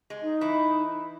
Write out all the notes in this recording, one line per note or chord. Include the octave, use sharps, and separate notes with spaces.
G#3
D#4
E3 E4